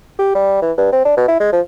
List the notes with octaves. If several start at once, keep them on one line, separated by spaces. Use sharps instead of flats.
G4
G3
E3
G2
C4
D4
B2
E4
G#3
F3